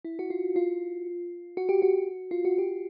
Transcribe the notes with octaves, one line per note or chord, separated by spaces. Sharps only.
E4
F#4
F4
F4
F#4
G4
F#4
F4
F#4
G4